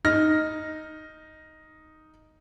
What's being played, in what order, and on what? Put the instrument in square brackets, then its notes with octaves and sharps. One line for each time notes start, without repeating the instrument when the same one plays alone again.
[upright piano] D#4 F6 A#6